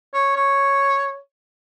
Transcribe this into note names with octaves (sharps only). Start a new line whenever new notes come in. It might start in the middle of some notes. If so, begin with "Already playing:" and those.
C#5
C#5